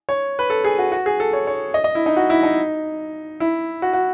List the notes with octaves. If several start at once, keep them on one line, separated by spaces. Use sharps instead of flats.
C#5
B4
A4
G#4
F#4
F#4
G#4
A4
C#5
C#5
D#5
D#5
E4
D#4
F#4
E4
D#4
E4
F#4
F#4